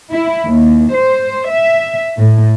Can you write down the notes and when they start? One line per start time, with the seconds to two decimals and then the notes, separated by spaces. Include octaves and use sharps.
0.11 E4
0.45 D#2
0.96 C5
1.52 E5
2.18 A2